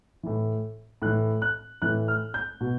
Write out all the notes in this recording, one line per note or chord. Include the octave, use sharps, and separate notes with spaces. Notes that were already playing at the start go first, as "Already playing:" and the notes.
A2 E3
A2 E3 F#6
F#6
A2 E3 F#6
F6
G6
B2